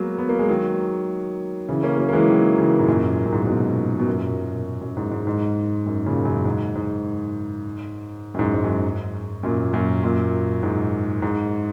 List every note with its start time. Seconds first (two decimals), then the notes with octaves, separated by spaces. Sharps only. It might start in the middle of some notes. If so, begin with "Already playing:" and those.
Already playing: F#3 G#3 A#3 B3
0.18 B3
0.29 A#3
0.39 G#3
0.49 D#3 F#3
1.69 C#3 E3
1.83 A#3 C#4
1.98 F#3 A#3
2.09 A#3
2.13 E3 G#3
2.28 D#3 F#3
2.58 C#3 E3
2.79 G#2
2.87 F#2 A#2
3.25 F#2
3.32 G#2
3.40 A#2
3.47 G#2 B2
3.99 B2
4.06 F#2 A#2
4.81 F#2
4.97 G#2
5.11 G#2
5.27 G#2
5.86 F#2
6.06 A#2 C#3
6.25 F#2 A#2
6.45 G#2
6.75 G#2
8.34 F#2
8.39 G#2
8.54 G#2
8.64 F#2
8.69 G#2
9.43 F#2 A#2
9.74 F#2 A#2
10.03 F#2 A#2
10.63 G#2
11.22 G#2